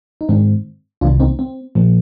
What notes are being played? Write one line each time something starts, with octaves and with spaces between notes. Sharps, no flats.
D#4
G#2 D#3 G#3 C4 D4
C2 C3 D#3 A#3 D4 F4
C4 D#4
C4
A#2 F3 A#3